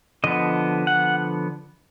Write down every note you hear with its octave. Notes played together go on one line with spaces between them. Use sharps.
D3 F3 B3 D#5
F#5